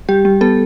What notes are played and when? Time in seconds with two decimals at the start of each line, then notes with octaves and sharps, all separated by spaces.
0.09 G3 G4
0.25 G3
0.41 B3 A4